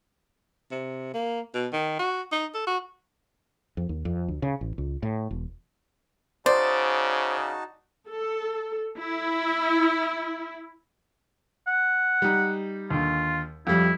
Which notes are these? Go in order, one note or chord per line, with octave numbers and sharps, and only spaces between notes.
C3
A#3
B2
D#3
F#4
D#4
A4
F#4
F2
D#2
F2
D2
C#3
A1
C#2
A2
E1
C#3 D#4 F#4 C5 D5 A5
A4
E4
F#5
G3 D#4
D#2 D3 F4
F2 G3 E4